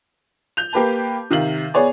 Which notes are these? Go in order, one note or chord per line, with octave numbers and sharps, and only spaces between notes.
G6 F7
A#3 G4 B4 A5
C3 D#3 F5 F#7
B3 G#4 C#5 D5